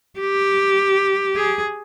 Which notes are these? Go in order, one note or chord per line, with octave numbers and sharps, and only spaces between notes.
G4
G#4